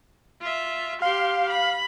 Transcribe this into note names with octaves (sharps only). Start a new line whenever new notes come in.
F4 E5
G4 F5 C6
B5